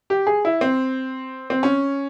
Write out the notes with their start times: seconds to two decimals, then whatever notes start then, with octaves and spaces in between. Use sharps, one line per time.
0.10 G4
0.27 G#4
0.45 E4
0.61 C4
1.50 C4
1.63 C#4